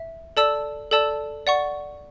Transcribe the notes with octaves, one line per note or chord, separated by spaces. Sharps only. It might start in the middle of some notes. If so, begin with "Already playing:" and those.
Already playing: E5
A4 D5 A5 E6
A4 D5 A5 E6
D5 F#5 C#6